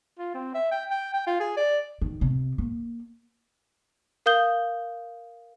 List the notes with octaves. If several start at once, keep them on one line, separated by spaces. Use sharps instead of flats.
F4
C4
E5
G5
G5
G5
F4
G#4
D5
D#3
C3
A#3
A#4 F5 D#6 G6 G7